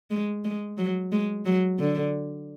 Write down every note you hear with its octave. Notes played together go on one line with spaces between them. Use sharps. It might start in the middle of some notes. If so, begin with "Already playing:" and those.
G#3
G#3
F#3
G#3
F#3
D3